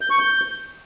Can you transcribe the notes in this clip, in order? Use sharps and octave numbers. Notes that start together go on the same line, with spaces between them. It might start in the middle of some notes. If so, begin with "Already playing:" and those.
G6
C#6
G6